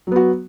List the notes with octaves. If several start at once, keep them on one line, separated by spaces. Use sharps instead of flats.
F#3 B3 F#4